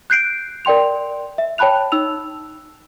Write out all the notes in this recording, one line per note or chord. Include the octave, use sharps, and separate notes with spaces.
F#6 G6 C7 D7
A#4 D5 G5 C6 F7
E5
C#5 G5 A5 B5 F#6 F7
D#4 E6 F7